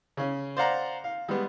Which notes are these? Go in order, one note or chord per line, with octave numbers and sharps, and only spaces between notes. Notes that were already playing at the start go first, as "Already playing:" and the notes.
C#3 C#4
C5 D5 F5 F#5 A#5
F5
G3 G#3 B3